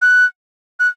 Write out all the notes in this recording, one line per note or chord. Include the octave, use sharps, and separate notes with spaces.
F#6
F#6